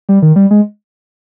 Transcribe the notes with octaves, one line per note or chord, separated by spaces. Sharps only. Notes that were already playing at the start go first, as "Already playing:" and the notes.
G3
D#3
G3
G#3